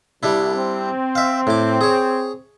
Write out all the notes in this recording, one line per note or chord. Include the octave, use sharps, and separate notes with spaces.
C2 G3 D4 E4
C4
E5 F5
A2 D6
G#4 C#5